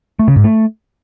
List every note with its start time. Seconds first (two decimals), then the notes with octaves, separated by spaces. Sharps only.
0.19 A3
0.28 C#3
0.36 G#2
0.44 A3